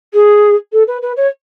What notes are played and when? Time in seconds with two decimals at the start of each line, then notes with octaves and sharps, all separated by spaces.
0.14 G#4
0.73 A4
0.87 B4
1.02 B4
1.17 C#5